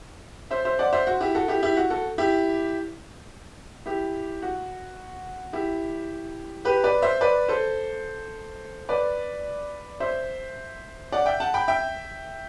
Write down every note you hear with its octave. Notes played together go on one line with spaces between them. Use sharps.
C5 E5
C5 E5
D5 F#5
C5 E5
F#4
E4 G4
F#4 A4
E4 G4
E4 G4
F#4
F#4 A4
E4 G4
E4 G4
F#4
E4 G4
G4 B4
B4 D5
C5 E5
B4 D5
A4 C5
B4 D5
C5 E5
D5 F#5
E5 G5
F#5 A5
G5 B5
E5 G5